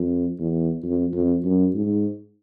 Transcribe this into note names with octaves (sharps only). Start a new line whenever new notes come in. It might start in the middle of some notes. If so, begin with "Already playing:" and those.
Already playing: F2
E2
F2
F2
F#2
G#2